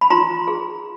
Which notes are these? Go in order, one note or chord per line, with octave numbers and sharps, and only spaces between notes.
B5
F4 A#5 C6
G#4